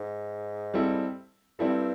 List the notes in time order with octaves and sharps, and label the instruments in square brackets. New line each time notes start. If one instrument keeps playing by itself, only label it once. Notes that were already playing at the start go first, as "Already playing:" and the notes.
Already playing: [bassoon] G#2
[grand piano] G3 C4 E4 A4
[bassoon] G2 [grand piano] G3 C4 E4 A4